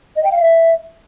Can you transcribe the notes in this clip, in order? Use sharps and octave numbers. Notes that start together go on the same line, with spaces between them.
D#5
G5
F5
E5